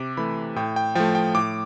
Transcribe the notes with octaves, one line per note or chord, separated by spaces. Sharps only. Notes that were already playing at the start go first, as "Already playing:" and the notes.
Already playing: C3 D6
E3 A3 B5
A2 G5
G5
F3 A3 G5
G5
A2 D6